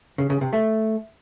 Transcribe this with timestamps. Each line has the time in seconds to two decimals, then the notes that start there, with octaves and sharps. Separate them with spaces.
0.18 C#3
0.30 C#3
0.41 C3
0.53 A3